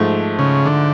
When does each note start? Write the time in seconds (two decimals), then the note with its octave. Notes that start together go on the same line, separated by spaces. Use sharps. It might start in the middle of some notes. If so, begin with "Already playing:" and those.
Already playing: G#2 F3 A3
0.39 C#3
0.66 D3